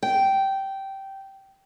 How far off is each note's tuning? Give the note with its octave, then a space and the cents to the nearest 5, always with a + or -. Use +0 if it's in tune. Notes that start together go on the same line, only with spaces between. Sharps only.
G5 -10